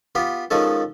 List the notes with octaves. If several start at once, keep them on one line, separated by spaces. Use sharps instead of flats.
B3 F4 G4
D#3 F3 G#3 C#4 A4